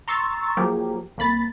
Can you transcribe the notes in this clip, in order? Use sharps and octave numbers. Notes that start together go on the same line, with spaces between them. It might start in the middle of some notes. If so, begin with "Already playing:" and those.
A#5 C6 C#6 E6 A6
F3 F#3 A#3 G4 G#4 A#4
C2 A#3 B5 A6